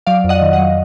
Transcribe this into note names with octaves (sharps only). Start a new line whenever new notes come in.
F#3 D5 F5
F2
D#5 F#5
D#3
D#5 F#5
F#3